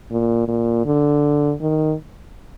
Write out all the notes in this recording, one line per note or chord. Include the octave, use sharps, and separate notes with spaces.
A#2
A#2
D3
D#3